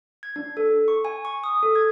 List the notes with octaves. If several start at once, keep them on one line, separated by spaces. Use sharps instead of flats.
G#6
D4
A4
C#6
G#5
C#6
D#6
A4
G#6